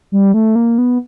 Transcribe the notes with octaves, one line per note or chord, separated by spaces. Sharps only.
G3
A3
A#3
B3